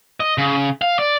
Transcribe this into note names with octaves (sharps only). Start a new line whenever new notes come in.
D#5
C#3
F5
D5